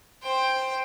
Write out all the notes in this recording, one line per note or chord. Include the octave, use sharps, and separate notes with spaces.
C5 G5